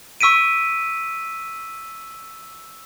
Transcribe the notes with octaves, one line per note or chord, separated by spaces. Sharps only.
C#6 E6 B6 D7 D#7